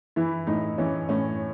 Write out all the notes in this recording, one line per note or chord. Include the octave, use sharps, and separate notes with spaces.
E3 E4
A2 D#4
E3 C#4
A2 C#4